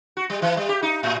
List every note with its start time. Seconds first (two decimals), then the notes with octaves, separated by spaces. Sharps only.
0.17 F#4
0.30 G3
0.42 E3
0.57 G3
0.69 G4
0.82 D#4
1.03 A2